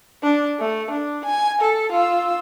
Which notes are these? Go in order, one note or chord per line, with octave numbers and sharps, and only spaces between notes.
D4
A3
D4
G#5
A4
F4 E6